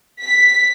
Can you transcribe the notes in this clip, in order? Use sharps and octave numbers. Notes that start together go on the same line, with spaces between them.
B6